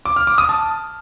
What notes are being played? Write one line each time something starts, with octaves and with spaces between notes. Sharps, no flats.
D6
F6
D6
D#6
A5